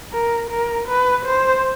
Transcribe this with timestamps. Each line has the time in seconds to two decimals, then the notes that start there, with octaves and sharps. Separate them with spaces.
0.13 A#4
0.51 A#4
0.88 B4
1.25 C5